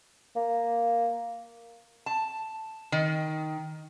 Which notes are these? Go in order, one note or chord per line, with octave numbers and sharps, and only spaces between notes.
A#3
A5
D#3